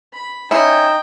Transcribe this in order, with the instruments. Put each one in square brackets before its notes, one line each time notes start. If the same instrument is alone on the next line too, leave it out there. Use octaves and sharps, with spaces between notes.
[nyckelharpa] B5
[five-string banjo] C#4 E4 [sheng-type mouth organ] D#4 [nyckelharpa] G5